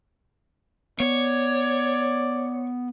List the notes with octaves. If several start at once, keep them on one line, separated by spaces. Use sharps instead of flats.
B3 C#5 D5